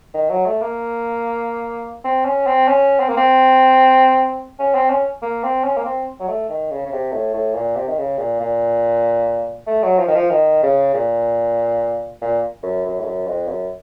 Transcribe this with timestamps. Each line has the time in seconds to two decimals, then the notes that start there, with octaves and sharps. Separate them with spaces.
0.14 D#3
0.30 F#3
0.46 A3
0.62 A#3
2.04 C4
2.25 C#4
2.47 C4
2.68 C#4
3.00 C4
3.09 A#3
3.17 C4
4.59 C#4
4.75 C4
4.90 C#4
5.22 A#3
5.44 C4
5.64 C#4
5.77 A#3
5.85 C4
6.20 F#3
6.28 A3
6.49 D#3
6.71 C#3
6.86 C#3
6.92 C3
7.13 A2
7.34 A2
7.55 A#2
7.76 C3
7.88 D#3
7.98 C#3
8.18 A#2
8.40 A#2
9.67 A3
9.83 F#3
9.99 F3
10.07 D#3
10.15 F3
10.30 D#3
10.63 C#3
10.94 A#2
12.21 A#2
12.63 F#2
12.85 F#2
13.00 A2
13.05 F#2
13.27 F2
13.48 F#2